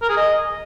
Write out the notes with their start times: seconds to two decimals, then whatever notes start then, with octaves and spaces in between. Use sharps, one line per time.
0.02 A#4
0.09 G#4
0.17 D#5